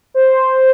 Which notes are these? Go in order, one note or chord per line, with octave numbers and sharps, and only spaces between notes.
C5